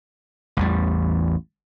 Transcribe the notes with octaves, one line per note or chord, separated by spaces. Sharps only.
A1 E2 G3